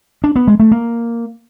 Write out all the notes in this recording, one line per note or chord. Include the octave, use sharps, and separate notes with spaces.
D4
B3
G#3
A3
A#3